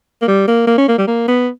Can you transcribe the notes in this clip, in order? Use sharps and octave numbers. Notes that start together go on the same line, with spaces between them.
A#3
G3
A#3
A#3
C#4
A#3
G3
A#3
B3